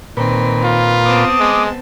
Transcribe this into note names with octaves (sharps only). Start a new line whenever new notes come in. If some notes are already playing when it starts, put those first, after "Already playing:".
A#2 D#3 C4 B4
F4
B3 C4 A5 D6 D#6
G#3